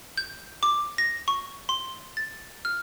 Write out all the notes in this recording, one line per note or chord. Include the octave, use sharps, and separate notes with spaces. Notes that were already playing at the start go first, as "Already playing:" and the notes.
G6
D6
A#6
C#6
C6
A6
F6